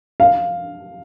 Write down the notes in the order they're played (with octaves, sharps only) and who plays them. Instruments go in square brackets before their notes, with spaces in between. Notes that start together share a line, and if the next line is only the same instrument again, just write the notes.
[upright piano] F5